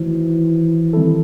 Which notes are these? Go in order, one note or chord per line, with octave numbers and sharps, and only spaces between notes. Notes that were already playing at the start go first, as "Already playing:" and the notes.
Already playing: D#3 E3 A3 D#4 F#4 C5
D#3 G3 C4 E4 A4